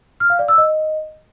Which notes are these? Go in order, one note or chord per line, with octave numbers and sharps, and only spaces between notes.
F6
F5
D5
E6
D#5